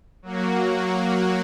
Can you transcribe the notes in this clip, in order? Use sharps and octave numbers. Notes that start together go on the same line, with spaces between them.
F#3 A#3 F#4